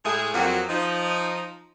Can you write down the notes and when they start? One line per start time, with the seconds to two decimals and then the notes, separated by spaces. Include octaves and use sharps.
0.05 A2 G#3 A3 G#4
0.34 F2 F#3 G3 A#3 C4 F#4
0.69 F3 D#4